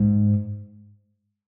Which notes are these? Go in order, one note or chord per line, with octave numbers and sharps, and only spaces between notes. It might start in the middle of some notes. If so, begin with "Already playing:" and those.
Already playing: G#2